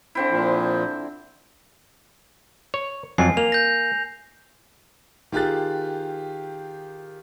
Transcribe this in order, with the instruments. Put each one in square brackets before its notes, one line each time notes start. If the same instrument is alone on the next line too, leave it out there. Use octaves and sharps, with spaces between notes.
[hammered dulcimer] D3 C4 E4
[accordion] A#2 F3
[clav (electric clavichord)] C#5
[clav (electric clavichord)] F2 F#3 [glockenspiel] G#5 C7
[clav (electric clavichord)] A#3 [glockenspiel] F7
[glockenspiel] G6 A#6
[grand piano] D#3 F4 G4 G#4 F#6 A6